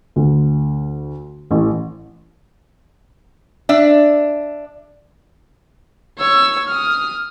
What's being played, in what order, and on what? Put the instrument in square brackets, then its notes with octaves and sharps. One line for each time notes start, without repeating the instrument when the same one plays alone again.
[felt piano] D2
A1
[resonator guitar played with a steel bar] D4 E5
[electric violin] C#5 E6
D#6 F6